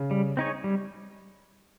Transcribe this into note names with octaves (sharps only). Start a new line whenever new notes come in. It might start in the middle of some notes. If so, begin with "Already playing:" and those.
Already playing: C#3
G3
C4 D#4 G#4 C#5
G3